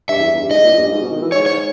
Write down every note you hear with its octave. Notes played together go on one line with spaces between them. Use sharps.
G2 E5
E2
E2
G2
G#2 D#5
A#2
E2
G2
G#2
B2
D#3
E3
G#2 C#5
C#5